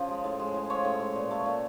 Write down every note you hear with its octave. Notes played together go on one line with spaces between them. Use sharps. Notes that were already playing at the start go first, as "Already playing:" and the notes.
Already playing: C#3 F3
G#3
A2
G#3
A2
F3 C#5
A2
G#3
A#2
A3
A#2